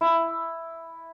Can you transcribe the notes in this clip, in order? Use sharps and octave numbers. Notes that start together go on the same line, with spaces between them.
E4